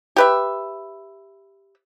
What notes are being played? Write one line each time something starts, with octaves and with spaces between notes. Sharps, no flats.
G4 B4 E5